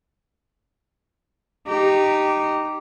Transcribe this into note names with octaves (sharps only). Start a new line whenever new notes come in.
D#4 G4